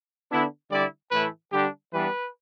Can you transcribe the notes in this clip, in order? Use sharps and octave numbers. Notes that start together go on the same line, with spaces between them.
D3 B3 D4 E4
D3 G3 E4 D5
A2 E3 A3 E4 B4
D3 G3 D4 G4
E3 G3 B3 D4 B4